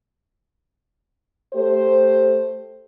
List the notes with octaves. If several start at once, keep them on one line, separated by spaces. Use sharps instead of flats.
A3 G4 C5